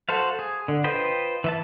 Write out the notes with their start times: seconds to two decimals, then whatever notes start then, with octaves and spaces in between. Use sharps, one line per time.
0.09 F#4 A4 C5 F5
0.39 G#4
0.68 D3
0.84 F4 B4 C5 D#5 G5
1.44 E3 E5 A5